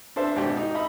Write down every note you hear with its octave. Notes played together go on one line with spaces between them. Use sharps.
D4 A4 C5 E5
G#1 B2 D4 G4 G5
D#4
D#5 E5 B5 D#6